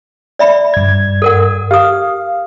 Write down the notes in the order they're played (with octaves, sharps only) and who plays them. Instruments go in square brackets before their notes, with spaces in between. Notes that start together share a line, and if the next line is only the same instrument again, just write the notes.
[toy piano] D5 E5 B5
[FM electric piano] G2 G#6
[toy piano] A4 A#4 F#5
[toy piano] G4 D#6 [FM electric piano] F5